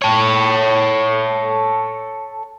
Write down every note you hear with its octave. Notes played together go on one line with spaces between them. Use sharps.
A4 C#5